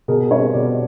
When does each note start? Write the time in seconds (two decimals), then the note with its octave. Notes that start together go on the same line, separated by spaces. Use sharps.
0.08 B2 G#4 A#4
0.31 G3 C4 C#5 D#5
0.54 B2 C5 D5